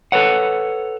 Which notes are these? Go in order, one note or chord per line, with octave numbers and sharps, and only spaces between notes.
A4 B4 C#5 F#5